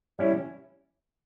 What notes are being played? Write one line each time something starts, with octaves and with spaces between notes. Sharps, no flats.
G3 C#4 E4 C#5